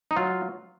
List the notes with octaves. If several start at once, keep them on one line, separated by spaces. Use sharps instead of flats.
D#4
F#3 F4